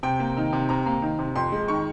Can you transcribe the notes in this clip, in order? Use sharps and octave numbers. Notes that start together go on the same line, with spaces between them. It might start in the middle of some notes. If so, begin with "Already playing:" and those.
C3 G5
A#3
D#3
C3
C3 A#5
A#3
D#3
C3
F2 C6
G#3
D#3 C#6